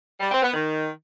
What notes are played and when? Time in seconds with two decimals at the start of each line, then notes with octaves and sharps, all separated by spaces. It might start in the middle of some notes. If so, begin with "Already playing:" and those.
0.20 G3
0.31 C4
0.42 B3
0.54 D#3